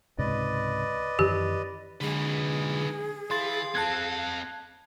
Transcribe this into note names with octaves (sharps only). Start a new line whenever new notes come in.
C#2 G#2 C3 B4 D5 D#5
F#2 D#3 E3 G4
D3 G#3 D#4 G#4 B4
E3 E4 F5 C6 A6
C4 A4 A5 F#6 G#6